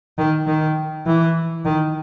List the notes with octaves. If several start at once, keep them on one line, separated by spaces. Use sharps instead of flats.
D#3
D#3
E3
D#3